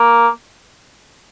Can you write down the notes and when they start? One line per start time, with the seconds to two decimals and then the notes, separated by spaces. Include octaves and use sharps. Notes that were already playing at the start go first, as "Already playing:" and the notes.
Already playing: A#3